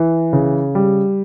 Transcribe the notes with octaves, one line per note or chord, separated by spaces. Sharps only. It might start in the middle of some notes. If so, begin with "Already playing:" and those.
Already playing: E3
C#3
G3